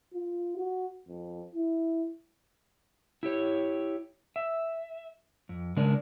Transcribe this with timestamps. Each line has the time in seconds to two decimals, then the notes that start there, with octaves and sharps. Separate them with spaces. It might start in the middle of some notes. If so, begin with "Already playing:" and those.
0.14 F4
0.57 F#4
1.08 F2
1.55 E4
3.23 E4 G4 C#5
4.36 E5
5.49 F2
5.76 C#3 G#3 D4 A#4 D5